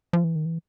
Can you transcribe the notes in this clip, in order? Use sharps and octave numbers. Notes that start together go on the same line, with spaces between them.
F3
E3
D#3
E3